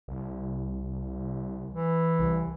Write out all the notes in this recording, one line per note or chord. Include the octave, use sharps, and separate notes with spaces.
C2
E3
C2